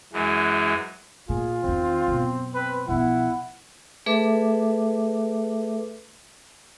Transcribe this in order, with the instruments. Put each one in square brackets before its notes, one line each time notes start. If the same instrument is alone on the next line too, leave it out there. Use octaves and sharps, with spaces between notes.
[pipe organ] F#2 E3 G#3
[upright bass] A#2 [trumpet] F4 [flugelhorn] G#4
[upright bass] E2 D#3 [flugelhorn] C4
[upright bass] F#2 B2
[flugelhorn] C4 [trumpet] B4
[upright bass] B1 F3 [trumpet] E4 [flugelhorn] F#5
[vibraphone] A3 G#4 A4 B4 E5 D6